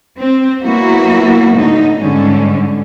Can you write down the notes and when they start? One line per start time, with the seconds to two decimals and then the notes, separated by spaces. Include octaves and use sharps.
0.17 C4
0.63 F#3 A#3 B3 E4 F#4
1.54 A2 D3 D#4
1.99 G#2 D3 G3 C#4